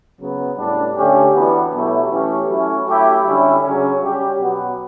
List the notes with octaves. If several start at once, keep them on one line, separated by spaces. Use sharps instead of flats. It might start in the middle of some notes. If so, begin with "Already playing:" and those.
C#3 F#3 B3
A2 G3 D4
D3 A3 C#4 G4
E3 B3 D4 F#4
B2 F#3 A3 E4 G4
E3 A3 C#4 G4
F#3 A3 C#4 E4
F#3 A3 E4 G4
D3 G3 C#4 E4
C#3 F#3 C#4
G3 C#4 G4
B2 F#3 B3 F#4